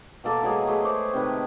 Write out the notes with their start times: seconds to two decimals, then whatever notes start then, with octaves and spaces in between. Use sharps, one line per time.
0.24 B2 A#3 A4 D6
0.43 E3 F#3 G#3 G#4
0.67 A3 G#4
0.83 C5 C#5 D6
1.14 C3 D#3 B4